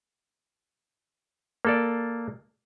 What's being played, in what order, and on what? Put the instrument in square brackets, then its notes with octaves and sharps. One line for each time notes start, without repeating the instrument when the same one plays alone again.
[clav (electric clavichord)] A#3 A4 D5